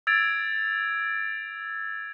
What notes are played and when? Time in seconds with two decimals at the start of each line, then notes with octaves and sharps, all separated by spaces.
0.07 E6 G#6 A6 D7 F7